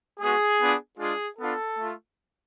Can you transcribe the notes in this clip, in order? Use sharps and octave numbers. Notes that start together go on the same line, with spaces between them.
G#3 B3 F#4 G#4
B3 D4 F4
G#3 D4 F4 G#4
B3 D4 F4 A4
A3 F4